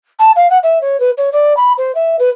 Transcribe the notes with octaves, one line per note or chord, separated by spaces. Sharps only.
A5
F5
F#5
E5
C#5
B4
C#5
D5
B5
C5
E5
B4